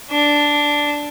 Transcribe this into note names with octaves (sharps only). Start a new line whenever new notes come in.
D4